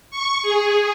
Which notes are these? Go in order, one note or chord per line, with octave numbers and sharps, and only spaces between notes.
C#6
G#4